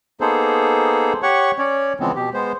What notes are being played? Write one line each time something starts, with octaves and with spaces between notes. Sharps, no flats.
A#3 B3 D#4 G#4 A4 C5
G4 C#5 F#5 C#6
C#4 C#5 D5
C#3 E3 F3 G#3 B3 C4
B2 G4
G#3 B3 C5